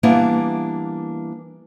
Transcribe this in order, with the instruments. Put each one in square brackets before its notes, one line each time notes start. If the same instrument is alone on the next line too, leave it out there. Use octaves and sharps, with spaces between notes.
[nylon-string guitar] E3 G3 A#3 B3 D4 E4